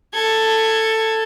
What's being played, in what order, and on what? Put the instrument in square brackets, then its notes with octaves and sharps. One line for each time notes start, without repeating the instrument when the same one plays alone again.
[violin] A4 G#6